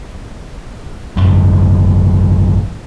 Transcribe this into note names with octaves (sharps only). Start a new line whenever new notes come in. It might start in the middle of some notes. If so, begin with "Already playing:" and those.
G#1 F#2